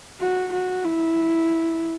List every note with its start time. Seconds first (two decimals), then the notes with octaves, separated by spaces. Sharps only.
0.20 F#4
0.52 F#4
0.85 E4